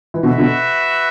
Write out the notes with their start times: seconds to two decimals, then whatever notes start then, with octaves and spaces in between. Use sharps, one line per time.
0.14 E3
0.22 B2 D3 F#4 B4 E5
0.38 B2 D3